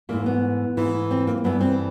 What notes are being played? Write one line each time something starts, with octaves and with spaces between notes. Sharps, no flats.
G#2 E3 A3 A#3
B3
G#2 E3 A3
C4
A#3
G2 E3 A3 B3
C4